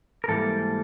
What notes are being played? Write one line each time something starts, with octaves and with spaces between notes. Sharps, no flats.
A#4
G#2 E3 G3 A#3 A4